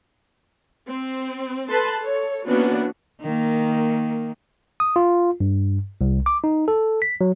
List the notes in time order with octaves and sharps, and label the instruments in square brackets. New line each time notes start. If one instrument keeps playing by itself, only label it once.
[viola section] C4
A4 B4 A5 C6
A4 C#5
E3 A#3 B3 C#4 D4 F#4
[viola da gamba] D#3 A#3
[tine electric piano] D#6
F4
G2
C2
D6
D#4
A4
B6
F#3